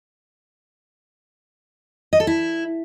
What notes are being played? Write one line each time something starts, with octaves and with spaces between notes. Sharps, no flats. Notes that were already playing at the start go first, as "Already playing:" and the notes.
D#5
A4
E4